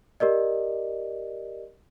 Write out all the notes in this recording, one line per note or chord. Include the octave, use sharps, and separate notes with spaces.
G4 A#4 D5 D#5